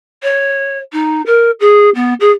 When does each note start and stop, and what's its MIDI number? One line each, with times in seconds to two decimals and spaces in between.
0.23 0.79 73
0.93 1.22 63
1.26 1.51 70
1.60 1.90 68
1.95 2.14 59
2.20 2.31 68